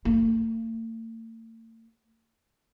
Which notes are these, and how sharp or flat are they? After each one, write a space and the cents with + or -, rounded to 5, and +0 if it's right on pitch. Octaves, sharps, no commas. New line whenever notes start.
A3 +45